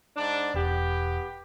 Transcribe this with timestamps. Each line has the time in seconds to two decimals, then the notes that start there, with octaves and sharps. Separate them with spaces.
0.16 G#2 D4
0.54 E1 B3 G4